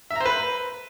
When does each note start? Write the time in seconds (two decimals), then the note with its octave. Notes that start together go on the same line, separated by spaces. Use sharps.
0.10 E5
0.15 A#5
0.21 C5
0.26 B4